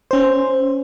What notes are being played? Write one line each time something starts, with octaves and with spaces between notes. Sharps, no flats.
C#4 C5